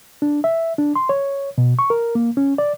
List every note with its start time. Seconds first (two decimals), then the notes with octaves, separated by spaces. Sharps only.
0.22 D4
0.44 E5
0.78 D4
0.96 C6
1.09 C#5
1.58 B2
1.79 C#6
1.90 A#4
2.15 A#3
2.37 C#4
2.58 D5